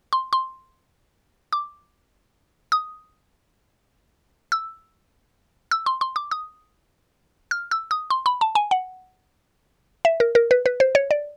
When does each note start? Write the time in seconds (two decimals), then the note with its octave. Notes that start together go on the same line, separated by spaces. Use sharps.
0.13 C6
0.33 C6
1.53 D6
2.72 D#6
4.52 E6
5.71 E6
5.86 C6
6.01 C6
6.16 D6
6.31 D#6
7.51 F6
7.71 E6
7.91 D#6
8.10 C6
8.26 B5
8.41 A5
8.55 G#5
8.71 F#5
10.05 E5
10.20 A#4
10.35 A#4
10.51 B4
10.66 B4
10.80 C5
10.95 C#5
11.11 D5